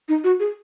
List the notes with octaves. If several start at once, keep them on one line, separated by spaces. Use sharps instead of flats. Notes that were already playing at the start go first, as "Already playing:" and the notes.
D#4
F#4
G#4